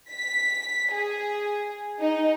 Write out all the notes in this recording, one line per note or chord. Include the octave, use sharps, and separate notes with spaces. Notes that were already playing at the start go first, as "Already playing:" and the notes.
B6
G#4
D#4